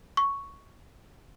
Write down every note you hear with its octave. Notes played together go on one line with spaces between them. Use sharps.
C#6